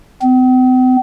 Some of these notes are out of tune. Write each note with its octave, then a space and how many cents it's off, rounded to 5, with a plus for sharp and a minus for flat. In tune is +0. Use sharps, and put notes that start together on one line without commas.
C4 -45